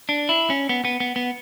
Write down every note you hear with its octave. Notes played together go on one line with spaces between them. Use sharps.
D4
E4
C#4
B3
B3
B3
B3